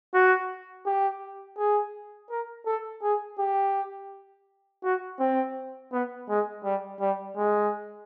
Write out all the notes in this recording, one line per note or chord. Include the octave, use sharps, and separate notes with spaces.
F#4
G4
G#4
A#4
A4
G#4
G4
F#4
C4
B3
G#3
G3
G3
G#3